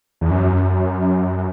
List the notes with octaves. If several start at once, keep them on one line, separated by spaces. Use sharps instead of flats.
E2
F#2